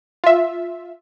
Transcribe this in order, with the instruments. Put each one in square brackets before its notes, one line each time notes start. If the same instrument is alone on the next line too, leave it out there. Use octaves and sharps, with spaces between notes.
[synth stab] F4 E5